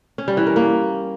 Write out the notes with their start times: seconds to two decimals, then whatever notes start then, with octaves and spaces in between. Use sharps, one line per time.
0.18 C#4
0.28 G3
0.37 E3
0.47 A#4
0.56 A#3